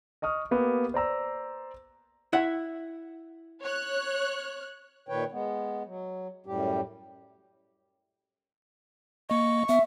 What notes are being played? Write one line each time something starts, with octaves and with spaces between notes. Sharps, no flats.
D#5 C#6 D#6 F6
A#3 B3 G4
C5 D5 A#5 E6
E4 E5 F#5
C#5 F#6
A#2 D#3 B4 C#5 G5
G#3 B3
F#3
F#2 A2 G3 G4
A#3 D#5 C#6
B3 E5